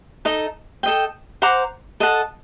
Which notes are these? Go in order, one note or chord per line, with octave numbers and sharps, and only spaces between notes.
D#4 A4 D#5
A4 D#5 G5
C5 F#5 A#5 D6
A4 D#5 F#5 A5